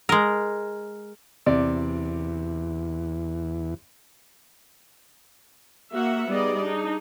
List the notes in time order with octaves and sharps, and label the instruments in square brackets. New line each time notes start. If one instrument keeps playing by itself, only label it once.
[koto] G#3 A#4
[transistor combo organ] E2 [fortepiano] C3 D5
[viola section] A#3 F#4 E5 F#5
G3 B3 D#4 G#4 D5 D#5
D4 D#4 G#4